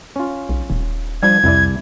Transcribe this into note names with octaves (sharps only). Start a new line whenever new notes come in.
C#4 F4
B1
D#1
F3 G3 D4 G#6
C2 F2 E4 D5